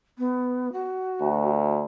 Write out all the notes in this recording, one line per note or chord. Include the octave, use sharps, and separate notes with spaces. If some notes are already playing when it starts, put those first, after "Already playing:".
B3
F#4
D2